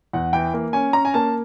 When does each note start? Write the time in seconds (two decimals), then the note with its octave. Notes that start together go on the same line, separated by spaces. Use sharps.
0.13 E2 F#5
0.33 E3 G5
0.54 A#3
0.73 C#4 G#5
0.93 C#4 A#5
1.05 G#5
1.14 A#3 A5